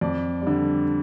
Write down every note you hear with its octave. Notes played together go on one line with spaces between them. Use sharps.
F2 D5
G3
D3